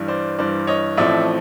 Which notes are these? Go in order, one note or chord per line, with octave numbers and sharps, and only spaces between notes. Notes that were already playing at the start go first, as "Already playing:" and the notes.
Already playing: G2 E3 G3
C5 D5
G2 E3 G3 C5 D5
C#5 D#5
A1 A2 F3 A3 C4 D5 E5